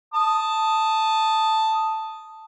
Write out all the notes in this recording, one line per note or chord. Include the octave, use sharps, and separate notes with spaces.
A5 D#6